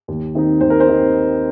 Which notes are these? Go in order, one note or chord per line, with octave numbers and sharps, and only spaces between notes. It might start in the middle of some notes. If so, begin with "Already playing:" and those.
D#2
D#3 C4 D#4
D#2 C5
A#4
C5
D#3 C4 D#4